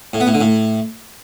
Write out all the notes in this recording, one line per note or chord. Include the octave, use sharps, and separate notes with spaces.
A2
B3
A2
D3
A2